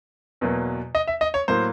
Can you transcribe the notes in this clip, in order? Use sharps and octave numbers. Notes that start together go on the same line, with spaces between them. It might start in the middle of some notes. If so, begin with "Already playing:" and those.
E2 B2 F#3 A#3
D#5
E5
D#5
C#5
A2 F#3 A#3 C5